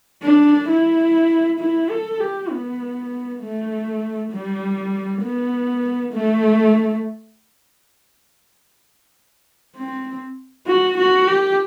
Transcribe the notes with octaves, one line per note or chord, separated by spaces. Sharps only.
D4
E4
E4
A4
G4
B3
A3
G3
B3
A3
C4
F#4
F#4
G4